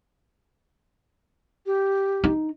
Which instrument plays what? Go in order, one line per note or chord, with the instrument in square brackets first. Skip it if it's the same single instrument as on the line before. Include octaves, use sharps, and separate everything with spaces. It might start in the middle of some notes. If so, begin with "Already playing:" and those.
[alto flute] G4
[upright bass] D#4